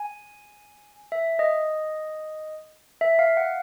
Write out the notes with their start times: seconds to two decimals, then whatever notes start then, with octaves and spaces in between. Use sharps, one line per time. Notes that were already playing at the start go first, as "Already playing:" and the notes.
Already playing: G#5
1.12 E5
1.39 D#5
3.01 E5
3.19 F5
3.37 F#5